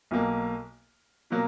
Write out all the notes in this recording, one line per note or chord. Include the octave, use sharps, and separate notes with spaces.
B1 B2 F#3 A#3
B2 F#3 A#3